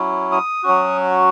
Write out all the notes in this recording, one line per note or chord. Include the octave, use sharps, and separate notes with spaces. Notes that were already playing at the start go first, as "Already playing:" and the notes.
Already playing: F#3 C#4 E4
D#6
F#3 C#4 F#4